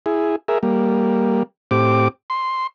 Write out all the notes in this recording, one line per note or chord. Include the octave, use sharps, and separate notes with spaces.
E4 G#4
G#4 A#4 E5
G3 A#3
A2 C4 G4 D6
C6